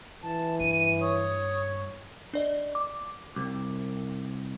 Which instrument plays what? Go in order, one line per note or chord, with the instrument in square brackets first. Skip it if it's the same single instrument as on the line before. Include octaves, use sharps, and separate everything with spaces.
[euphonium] E3 [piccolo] A5
[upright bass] G2 [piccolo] D#7
[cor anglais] C#5 [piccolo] D#6
[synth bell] D4 D5 D#5
D6
[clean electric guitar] C2 [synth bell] D6